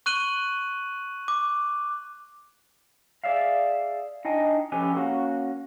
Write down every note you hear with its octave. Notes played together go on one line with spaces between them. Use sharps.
C#6 F#6 D#7 F#7 G7
D6
G#4 D5 E5 F5
D4 D#4 D#5 G5 G#5
F3 C#4 G4 A4 B4 G#5
A#3 C#4 F#4